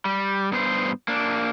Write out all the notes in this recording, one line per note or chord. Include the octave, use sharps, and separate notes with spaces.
G3
G2 B3 C5
A#3 D4